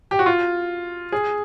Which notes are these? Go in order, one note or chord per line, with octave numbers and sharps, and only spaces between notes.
G4
F#4
F4
G#4